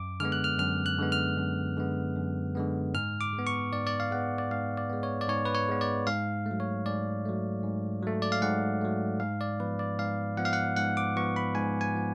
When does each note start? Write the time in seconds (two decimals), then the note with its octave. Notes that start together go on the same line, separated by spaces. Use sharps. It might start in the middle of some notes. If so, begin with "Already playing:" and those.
Already playing: F#2 D6
0.20 D3 G#3 B3 F6
0.32 F#6
0.44 F6
0.59 F#2 F6
0.86 F#6
0.98 D3 G#3 B3
1.12 F6
1.38 F#2
1.77 D3 G#3 B3
2.16 F#2
2.55 D3 G#3 B3
2.94 G#2 F6
3.21 D6
3.33 G#3
3.38 B3
3.47 C#6
3.72 G#2 D5
3.87 D5
4.00 F5
4.11 G#3 B3 F#5
4.38 D5
4.51 G#2 F5
4.77 D5
4.90 G#3 B3
5.03 C#5
5.21 D5
5.28 G#2 C#5
5.45 B4
5.55 C#5
5.68 G#3 B3
5.81 D5
6.07 G#2 F5
6.46 A3
6.51 F#3
6.60 C#5
6.86 G#2 D5
7.25 F#3 A3
7.64 G#2
8.03 F#3 A3
8.22 D5
8.32 F5
8.42 G#2 F#5
8.81 F#3 A3
9.20 G#2 F5
9.41 D5
9.59 F3 B3 B4
9.79 D5
9.99 G#2 F5
10.37 F3 B3 F#5
10.45 F5
10.53 F#5
10.77 G#2 F#5
10.97 D6
11.16 F3 B3 C#6
11.36 B5
11.55 G#2 G#5
11.81 G#5
11.95 F3 B3